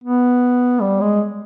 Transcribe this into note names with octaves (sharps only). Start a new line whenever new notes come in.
B3
G3
G#3